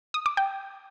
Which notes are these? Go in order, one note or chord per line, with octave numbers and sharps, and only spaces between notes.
D#6
D6
G5